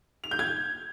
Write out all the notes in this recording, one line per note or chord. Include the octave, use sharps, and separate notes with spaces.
F7
G6
G#6